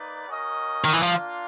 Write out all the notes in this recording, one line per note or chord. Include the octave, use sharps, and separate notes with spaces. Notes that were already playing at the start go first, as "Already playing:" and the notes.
Already playing: A#3 D#4 B4 D5
C#4 F#4 A#4 D#5
D#3
E3
F3 A#3 D4 F4